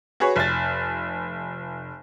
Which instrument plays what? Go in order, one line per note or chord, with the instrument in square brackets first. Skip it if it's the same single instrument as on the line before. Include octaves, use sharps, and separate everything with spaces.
[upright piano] F#4 G#4 B4 C#5
F1 A6